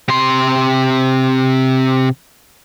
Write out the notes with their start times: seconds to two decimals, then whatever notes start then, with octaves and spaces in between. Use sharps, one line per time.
0.08 C3 C6